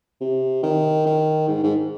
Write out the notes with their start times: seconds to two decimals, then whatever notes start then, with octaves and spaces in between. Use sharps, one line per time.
0.20 C3
0.63 D#3
1.06 D#3
1.48 G#2
1.63 G#2